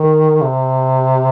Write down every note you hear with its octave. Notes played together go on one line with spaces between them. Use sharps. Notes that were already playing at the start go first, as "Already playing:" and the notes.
Already playing: D#3
C3